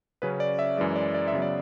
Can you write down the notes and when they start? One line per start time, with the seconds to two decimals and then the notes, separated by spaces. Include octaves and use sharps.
0.22 C#3 F#3 C#4 B4
0.40 D5
0.59 E5
0.77 F#2 E3 G#3 D5
0.96 D5
1.15 D5
1.28 E5
1.33 C#3 F#3 B3
1.42 D5